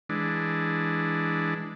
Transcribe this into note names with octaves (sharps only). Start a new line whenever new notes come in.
E3 G#3 D4